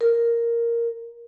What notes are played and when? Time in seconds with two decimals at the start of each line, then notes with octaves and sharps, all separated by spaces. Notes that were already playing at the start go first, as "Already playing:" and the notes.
0.01 A#4